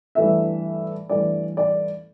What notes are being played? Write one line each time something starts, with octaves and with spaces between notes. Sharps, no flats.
G2 E3 A3 E5
G2 E3 A3 D5
D5